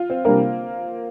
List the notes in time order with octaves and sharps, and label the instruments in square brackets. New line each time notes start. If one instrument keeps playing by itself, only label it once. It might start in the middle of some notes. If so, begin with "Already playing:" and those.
Already playing: [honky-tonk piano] F4
C4
[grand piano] C3 G3 D4 A#4 [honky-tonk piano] A#3